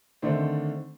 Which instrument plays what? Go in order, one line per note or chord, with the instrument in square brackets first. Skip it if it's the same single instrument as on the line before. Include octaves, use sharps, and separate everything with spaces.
[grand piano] D3 D#3 A3 C4